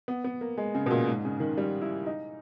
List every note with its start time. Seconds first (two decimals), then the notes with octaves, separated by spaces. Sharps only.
0.08 B3
0.24 B3
0.41 A#3
0.57 G#3
0.75 C#3
0.86 B2
0.91 A#2
1.07 G#2
1.25 C#3
1.40 D#3
1.57 G3
1.81 E4
2.06 D#4